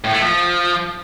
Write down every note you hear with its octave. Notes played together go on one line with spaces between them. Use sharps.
A2
A3
F3